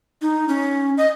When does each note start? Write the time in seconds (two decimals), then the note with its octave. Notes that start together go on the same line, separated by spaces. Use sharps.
0.22 D#4
0.49 C#4
0.97 D#5